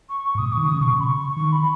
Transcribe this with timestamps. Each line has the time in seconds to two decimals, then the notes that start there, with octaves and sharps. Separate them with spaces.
0.09 C#6
0.24 C#6
0.35 G#2
0.38 A#2 D#6
0.52 D#3 C#6
0.66 C#3 D#6
0.80 B2 C#6
0.93 C#3
1.00 B5
1.04 C#6
1.20 C#6
1.36 D#3 C#6
1.52 B5